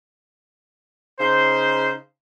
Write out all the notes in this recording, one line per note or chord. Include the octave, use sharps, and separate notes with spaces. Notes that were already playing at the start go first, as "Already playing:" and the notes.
C#3 D#4 C5